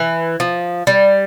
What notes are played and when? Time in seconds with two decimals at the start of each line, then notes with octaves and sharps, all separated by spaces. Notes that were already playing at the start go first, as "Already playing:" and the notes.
Already playing: E3
0.40 F3
0.87 G3